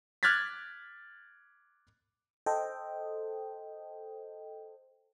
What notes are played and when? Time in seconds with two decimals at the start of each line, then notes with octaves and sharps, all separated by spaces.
0.23 D6 F6 F#6 G#6 A6 B6
2.46 A4 C5 D#5 G5